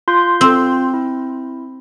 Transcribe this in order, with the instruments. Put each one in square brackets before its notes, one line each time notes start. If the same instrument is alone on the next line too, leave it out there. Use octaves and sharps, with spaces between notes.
[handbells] F4 C6 G6
[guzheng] C4
[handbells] E4